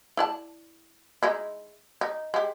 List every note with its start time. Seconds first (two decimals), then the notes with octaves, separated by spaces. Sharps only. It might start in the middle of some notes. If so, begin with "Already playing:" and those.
0.17 E4 D5 A5
1.23 G#3 D#4 E4
2.01 D#4
2.34 G#3 G4